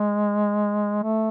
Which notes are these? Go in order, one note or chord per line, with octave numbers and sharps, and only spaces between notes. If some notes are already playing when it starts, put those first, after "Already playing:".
Already playing: G#3
A3